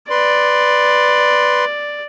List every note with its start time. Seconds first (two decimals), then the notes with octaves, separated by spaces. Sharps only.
0.10 B4 D5 C6